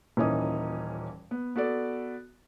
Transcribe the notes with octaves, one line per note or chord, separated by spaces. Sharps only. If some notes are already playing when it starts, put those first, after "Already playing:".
D#1 A#2 E3 C#4 D#4 D#6
B3
B3 F#4 A4 D5